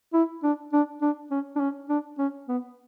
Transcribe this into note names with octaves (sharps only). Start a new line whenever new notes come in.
E4
D4
D4
D4
C#4
D4
C#4
D4
C#4
B3